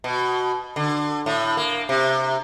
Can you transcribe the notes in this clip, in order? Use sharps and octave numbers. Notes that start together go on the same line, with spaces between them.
B2
D3
A2
A#3
C3